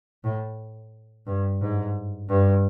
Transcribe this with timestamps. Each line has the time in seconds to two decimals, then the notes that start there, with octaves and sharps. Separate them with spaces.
0.24 A2
1.26 G2
1.61 G#2
2.29 G2